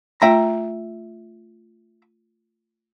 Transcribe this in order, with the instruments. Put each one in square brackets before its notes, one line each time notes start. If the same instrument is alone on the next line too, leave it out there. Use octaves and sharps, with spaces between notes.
[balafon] A3 F4 [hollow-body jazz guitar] E5 G5 A#5